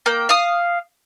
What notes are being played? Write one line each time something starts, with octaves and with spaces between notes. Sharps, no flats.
A#3 G5
F5 D#6